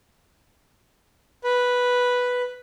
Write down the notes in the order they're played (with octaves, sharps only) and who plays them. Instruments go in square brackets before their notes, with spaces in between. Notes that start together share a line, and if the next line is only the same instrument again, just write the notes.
[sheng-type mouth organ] B4